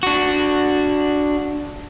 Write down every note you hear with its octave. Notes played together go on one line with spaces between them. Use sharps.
D4 F#4